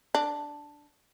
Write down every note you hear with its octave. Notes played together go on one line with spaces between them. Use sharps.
D4